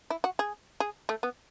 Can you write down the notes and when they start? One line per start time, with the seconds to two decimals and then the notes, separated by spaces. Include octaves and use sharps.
0.10 E4
0.24 F#4
0.39 G#4
0.80 G#4
1.09 A3
1.23 B3